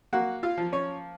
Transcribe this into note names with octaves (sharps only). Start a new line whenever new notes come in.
A#3 F#4 F#5
F4 F5
F3
C#4 C#5